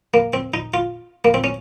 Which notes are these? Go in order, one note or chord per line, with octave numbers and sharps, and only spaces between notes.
A#3
C4
D#4
F4
A#3
C4
C#4